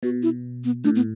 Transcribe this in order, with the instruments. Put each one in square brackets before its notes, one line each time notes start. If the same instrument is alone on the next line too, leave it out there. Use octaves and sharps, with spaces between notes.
[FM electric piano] B2 [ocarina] F#4
[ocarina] E4
B3
[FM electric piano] A2 [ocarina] D4
[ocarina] B3